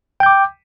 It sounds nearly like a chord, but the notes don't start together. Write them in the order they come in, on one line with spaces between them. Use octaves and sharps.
G5 G6 D6